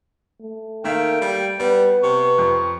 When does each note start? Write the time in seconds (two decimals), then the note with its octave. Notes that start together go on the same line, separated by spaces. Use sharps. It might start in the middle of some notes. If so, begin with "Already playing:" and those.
0.41 A3
0.84 D#3 A#3 E5 F5 G5
1.21 G3
1.59 G3 B3 B4
2.03 C3 C#6
2.38 F2